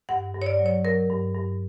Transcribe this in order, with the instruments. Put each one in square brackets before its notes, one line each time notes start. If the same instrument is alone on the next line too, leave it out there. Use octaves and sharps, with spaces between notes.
[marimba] G2 F#5
G2
C#5
D5
F#3
C#5
F#3 A#4
G2
G2